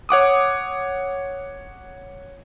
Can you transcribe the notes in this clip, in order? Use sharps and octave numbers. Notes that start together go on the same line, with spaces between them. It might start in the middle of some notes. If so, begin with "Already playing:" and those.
C#5 F#5 D6 D#6